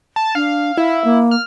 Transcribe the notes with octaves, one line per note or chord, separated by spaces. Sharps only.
A5
D4 F5
E4 F5
A#3
F6